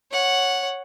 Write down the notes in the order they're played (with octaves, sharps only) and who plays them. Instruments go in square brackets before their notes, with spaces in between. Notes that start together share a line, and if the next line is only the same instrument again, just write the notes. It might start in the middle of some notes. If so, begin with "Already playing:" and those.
[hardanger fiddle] C#5 F#5